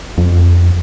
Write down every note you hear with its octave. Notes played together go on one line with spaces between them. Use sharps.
F2